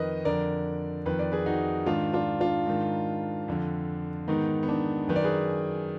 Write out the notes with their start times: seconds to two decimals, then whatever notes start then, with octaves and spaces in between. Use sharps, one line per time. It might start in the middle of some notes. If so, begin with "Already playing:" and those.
Already playing: F2 D#3 A#4 B4 D#5
0.25 F2 D3 A#4 D5
1.06 F2 D#3 B4
1.19 D5
1.32 G#4 B4
1.46 D#4 F#4
1.86 G#2 D#3 D4 F4
2.13 D4 F4
2.41 D4 F4
2.67 G#2 D#3
3.48 F2 D3
4.28 G#2 D#3 B3 D#4
4.63 B3
4.69 D4
5.08 F#2 D#3 B4
5.16 D5
5.24 G#4 B4